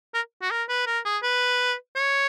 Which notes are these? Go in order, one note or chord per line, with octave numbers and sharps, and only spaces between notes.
A#4
F#4
A#4
B4
A#4
G#4
B4
C#5